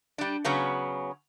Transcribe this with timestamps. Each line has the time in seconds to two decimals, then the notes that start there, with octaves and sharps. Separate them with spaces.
0.18 G3 D4
0.45 C#3 F#3 B3 C#4